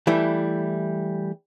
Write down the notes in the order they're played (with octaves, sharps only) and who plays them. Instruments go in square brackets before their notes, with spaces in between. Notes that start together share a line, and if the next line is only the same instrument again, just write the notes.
[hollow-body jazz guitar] E3 G3 A3 E4